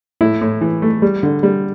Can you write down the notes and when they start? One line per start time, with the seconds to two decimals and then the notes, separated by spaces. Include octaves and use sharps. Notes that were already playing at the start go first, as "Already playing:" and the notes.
0.21 A2 E4
0.41 A2
0.61 E3
0.82 A3
1.02 G3
1.23 D3
1.43 G3